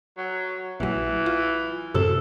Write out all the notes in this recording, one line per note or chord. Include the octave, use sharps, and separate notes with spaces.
F#3
A#1 E3 F#3
F4
F#2 A2 C3 A4